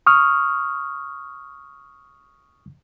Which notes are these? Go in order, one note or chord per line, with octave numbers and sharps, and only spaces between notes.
C#6 D#6 F6